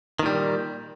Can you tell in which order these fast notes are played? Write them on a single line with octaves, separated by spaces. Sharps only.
D#3 A#2 G3